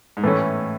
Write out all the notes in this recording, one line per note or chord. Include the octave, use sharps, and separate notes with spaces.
G#2
A2 E3 A3 C#4